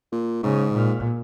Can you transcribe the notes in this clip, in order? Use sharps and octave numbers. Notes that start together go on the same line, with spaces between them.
A#2
G#2 C#3
A#2